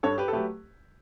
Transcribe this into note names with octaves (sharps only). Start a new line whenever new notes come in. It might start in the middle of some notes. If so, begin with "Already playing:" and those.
G2 A4 C#5
G4 B4
A4
F#3 A3 G4 B4